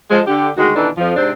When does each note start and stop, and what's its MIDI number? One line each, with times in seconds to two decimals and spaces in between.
0.10 0.21 53
0.10 0.21 56
0.28 0.49 50
0.28 0.49 67
0.56 0.70 38
0.56 0.70 51
0.56 0.70 56
0.56 0.70 66
0.76 0.89 47
0.76 0.89 51
0.76 0.89 52
0.76 0.89 62
0.76 0.89 63
0.76 0.89 69
0.98 1.15 41
0.98 1.15 53
1.17 1.31 44
1.17 1.31 48
1.17 1.31 60
1.17 1.31 62
1.17 1.31 72